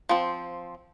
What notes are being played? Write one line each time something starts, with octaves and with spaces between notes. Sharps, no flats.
F3 C4